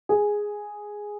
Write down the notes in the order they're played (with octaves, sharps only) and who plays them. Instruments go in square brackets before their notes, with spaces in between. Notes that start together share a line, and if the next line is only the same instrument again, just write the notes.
[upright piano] G#4